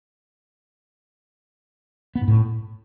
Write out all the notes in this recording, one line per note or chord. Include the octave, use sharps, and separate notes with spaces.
B3
G#2
A2